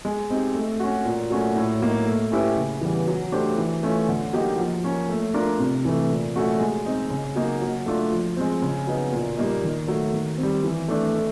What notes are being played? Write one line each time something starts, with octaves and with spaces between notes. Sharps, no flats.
G#3
C4 D#4 G4
A3
C#4 F#4
A#2
F#3 A3 C#4 F#4
A2
F#3 A#3 D#4
A3
C#4 E4 G4 B4
C#3
E3 G3 B3
F#3
A3 D4 G4 C5
E3
A3 C#4 F4
D3
F#3 A#3 D#4 G4
F3
A#3 C#4
A3
D4 F4 A#4
C3
E3 A3
A#2
F#3 A3 C#4 F#4
G#3
C4 D#4
C#3
F#3 A#3 D#4
F#3
A3 D4 F4
F3
G#3 C4
C#3
F#3 B3 D#4
A#2
G3 A#3 D#4
D#3
F#3 A3
D#3
C4
G3
E3
A3 D4
A3